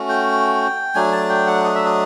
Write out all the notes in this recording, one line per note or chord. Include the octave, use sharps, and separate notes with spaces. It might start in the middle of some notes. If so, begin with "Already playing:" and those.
Already playing: A3 C#4 F#4
G5
F#3 A3 D4 G#5
A5
G5
F#5
D#5
E5
D#5